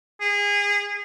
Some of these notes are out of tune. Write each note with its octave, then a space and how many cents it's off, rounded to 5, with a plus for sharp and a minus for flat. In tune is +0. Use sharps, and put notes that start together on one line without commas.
G#4 -25